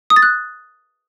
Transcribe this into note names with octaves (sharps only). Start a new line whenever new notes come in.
D#6
A6
F#6